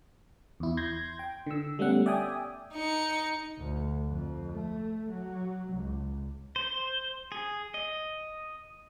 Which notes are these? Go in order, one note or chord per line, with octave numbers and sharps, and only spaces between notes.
E2 E4
C6 G6 G#6 A#6
G5
D3 E6
G3 A3 B3 C#4 F#5
D5 E5 G5 G#5 D#6
D#4 C#7
D2
F2
A3
F#3
C#2
C5
G#4
D#5